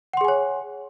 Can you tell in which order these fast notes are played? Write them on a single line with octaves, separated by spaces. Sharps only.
F#5 C6 G#4 G#5 C#5